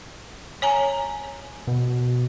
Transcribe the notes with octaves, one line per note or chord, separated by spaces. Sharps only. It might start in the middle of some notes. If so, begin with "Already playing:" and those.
C#5 G#5 A#5
B2